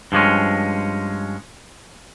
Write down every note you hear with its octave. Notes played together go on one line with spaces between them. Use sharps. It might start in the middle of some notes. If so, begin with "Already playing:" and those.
G2 F3 G#3 C#4